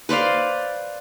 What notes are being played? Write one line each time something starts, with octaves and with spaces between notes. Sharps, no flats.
B4 C5 D5 F5